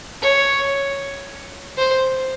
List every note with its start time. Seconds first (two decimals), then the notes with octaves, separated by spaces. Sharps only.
0.22 C#5
1.78 C5